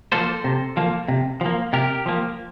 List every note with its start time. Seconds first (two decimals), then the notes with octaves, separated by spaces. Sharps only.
0.12 F3 A#3 A4 C5
0.44 C3
0.77 F3 A#3
1.08 C3
1.41 F3 A#3
1.73 C3 G4 A#4
2.06 F3 A#3